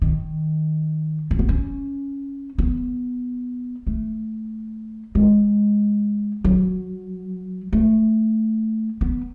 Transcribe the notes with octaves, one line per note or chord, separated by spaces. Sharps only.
D#3
C#4
B3
C#4
B3
A3
G#3
F#3
A3
B3